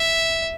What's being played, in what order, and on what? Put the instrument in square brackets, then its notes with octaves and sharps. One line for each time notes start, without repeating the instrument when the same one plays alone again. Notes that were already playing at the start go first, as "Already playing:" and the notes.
Already playing: [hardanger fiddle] E5